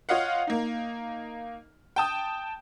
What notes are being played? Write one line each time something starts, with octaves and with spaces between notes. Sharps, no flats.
F4 C#5 D#5 F5 F#5
A#3 D#4
G5 A5 D#6